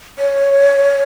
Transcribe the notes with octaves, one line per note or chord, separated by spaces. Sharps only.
C#5